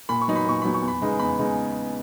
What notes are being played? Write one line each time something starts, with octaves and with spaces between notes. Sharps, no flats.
A#2 B5
C#6
F#3 B3 D#4
B5
A#2 C#6
F#3 B3 D#4 B5
C#6
E2
B5
C#3 G#3 B3 D#4
E2 B5
C#3 G#3 B3 D#4